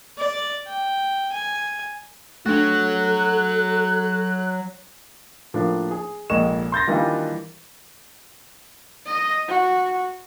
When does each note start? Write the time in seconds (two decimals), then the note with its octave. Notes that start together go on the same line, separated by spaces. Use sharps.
0.18 D5
0.67 G5
1.32 G#5
2.46 F#3 A3 D4 F#4 A4 F#6
5.54 A2 F3 A#3 D4
5.91 G#4
6.30 F1 A#1 A#2 G#3 C#6 E7
6.72 C6 G6 A6 A#6
6.87 D#3 E3 G3 A#3 D4 F4
9.06 D#5
9.49 F#4